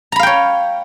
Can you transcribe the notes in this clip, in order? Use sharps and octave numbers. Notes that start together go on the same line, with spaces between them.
C#5 F5 G5 A#5 B5